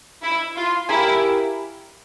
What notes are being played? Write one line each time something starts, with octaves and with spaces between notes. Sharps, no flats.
E4
F4
E4 G4 A#4 F5 G#5